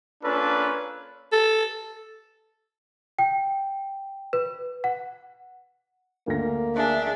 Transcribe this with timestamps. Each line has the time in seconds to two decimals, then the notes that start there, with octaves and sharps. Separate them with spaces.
0.24 A#3 C#4 D4 F4 A4 B4
1.32 A4
3.19 G5
4.33 B4
4.84 F#5
6.28 D2 A#3 A#6
6.76 D4 G#4 E5